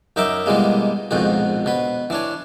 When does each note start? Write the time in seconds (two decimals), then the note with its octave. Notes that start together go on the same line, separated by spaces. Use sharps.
0.16 F#2 D#4 A#4 E5 D6
0.46 B2 E3 G3 G#3 A#3
1.11 A#1 F2 G#2 B2 F#4
1.66 B2 B4
2.10 E3 D4 C#5